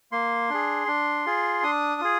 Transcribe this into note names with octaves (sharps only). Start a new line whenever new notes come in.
A#3 C6
D4 G#4
D4
F4 G#4
D4 D#6
F4 G#4